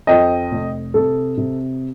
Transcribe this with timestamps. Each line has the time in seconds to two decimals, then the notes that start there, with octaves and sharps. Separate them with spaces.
0.07 F2 D#5 G5
0.52 F1
0.94 C3 A4
1.38 C3